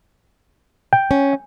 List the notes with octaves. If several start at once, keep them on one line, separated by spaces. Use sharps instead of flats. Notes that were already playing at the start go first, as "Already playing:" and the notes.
G5
C#4